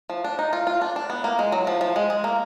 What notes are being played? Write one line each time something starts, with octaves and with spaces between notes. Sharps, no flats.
F3
D4
D#4
F4
F4
D4
D4
B3
A#3
G#3
F#3
F3
F3
G#3
G#3
A#3